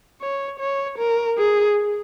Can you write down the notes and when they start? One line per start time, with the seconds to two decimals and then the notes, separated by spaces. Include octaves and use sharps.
0.22 C#5
0.60 C#5
0.99 A#4
1.38 G#4